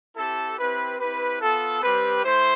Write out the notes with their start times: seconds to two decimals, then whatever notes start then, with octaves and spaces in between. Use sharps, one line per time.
0.15 C4 E4 G4 A4
0.58 C4 E4 G4 B4
0.99 C4 E4 G4 B4
1.41 B3 F4 A4
1.82 G3 C4 G4 B4
2.23 A3 E4 C5